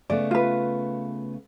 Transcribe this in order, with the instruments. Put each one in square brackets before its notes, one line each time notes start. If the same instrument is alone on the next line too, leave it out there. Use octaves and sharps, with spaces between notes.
[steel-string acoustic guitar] C#3 A3 B3 [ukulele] D5
[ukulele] F4 B4